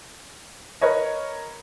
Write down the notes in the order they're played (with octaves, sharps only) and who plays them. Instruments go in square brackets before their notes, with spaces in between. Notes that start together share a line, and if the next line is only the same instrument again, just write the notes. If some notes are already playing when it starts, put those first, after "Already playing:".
[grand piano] A#4 B4 C#5 D#5